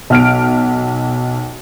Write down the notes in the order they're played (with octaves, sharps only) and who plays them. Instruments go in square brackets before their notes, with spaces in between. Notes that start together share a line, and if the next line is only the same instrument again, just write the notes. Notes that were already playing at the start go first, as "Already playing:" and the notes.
[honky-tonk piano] B1 F6 D7